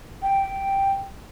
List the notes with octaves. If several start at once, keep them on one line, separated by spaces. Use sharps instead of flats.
G5